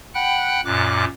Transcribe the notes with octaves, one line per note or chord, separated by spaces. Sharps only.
F#5 G5 B5 F#6
F#2 A#2 D6 F#6